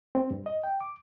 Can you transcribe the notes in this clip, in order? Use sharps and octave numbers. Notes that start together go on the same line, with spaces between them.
C4
G2
D#5
G5
D6